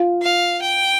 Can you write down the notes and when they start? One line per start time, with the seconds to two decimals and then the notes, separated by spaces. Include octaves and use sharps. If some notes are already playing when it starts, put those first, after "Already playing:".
Already playing: F4
0.22 F5
0.62 G5